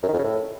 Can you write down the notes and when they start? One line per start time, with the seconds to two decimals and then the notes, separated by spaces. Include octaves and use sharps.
0.03 F#2
0.08 D#3
0.13 F2
0.19 C#3
0.24 A2